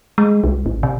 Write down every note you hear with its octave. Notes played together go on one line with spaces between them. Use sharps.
G#3
C2
G#1
C3